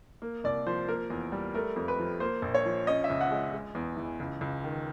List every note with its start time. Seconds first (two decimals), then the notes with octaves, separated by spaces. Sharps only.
0.22 A#3
0.44 C2 D5
0.67 F3 C5
0.88 A#3 A#4
1.10 E2
1.32 G3
1.54 A3 A#4
1.76 F2
1.88 B4
1.99 F3
2.20 A#3 C5
2.42 A#1
2.55 C#5
2.66 F3
2.87 C#4 D#5
3.04 E5
3.10 C#2
3.21 F#5
3.31 G#3
3.53 G#3
3.75 E2
3.97 E3
4.20 C#2
4.41 C#2
4.64 D#3